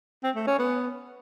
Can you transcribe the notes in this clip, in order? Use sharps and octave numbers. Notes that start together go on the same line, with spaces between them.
C4
A3
C#4
B3